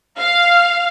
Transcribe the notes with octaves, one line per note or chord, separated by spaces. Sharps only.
F5